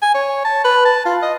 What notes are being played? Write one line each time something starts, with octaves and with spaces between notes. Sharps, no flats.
G#5
C#5
A5
B4
A5
F4
D#5